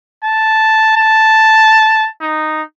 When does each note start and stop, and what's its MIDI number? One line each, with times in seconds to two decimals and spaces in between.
0.24 0.95 81
0.96 2.09 81
2.21 2.62 63